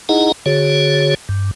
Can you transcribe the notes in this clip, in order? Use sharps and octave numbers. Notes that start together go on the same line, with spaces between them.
D#4 E4 G#4 D#5 F#5 A#5
D3 F#4 G#4 C#5
G2